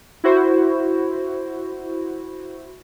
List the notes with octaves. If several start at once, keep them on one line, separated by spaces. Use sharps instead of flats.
E4 F#4 C5